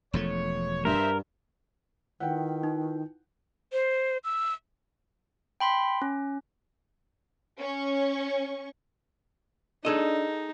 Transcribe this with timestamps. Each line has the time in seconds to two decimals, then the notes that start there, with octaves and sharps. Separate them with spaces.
0.13 E1 F3 A3 C#5
0.85 G2 A#4 C5 E5
2.20 D#3 E4 F4 B4 F#5 G5
2.63 D#4
3.73 C5
4.24 E6
5.60 G5 B5 C6 B6
6.02 C#4
7.59 C#4 C#6
9.85 D4 D#4 G#4 A4 D#5